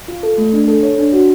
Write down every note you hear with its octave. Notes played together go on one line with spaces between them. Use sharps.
F4
A4
A3
D4
A4
C#5
D4
F#4